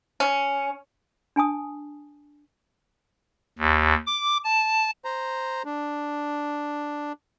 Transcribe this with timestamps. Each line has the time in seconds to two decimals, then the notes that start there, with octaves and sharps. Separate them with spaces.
0.20 C#4
1.36 D4 G#5 A5 D#6
3.58 D#2
4.07 D6
4.44 A5
5.05 C5 A#5
5.65 D4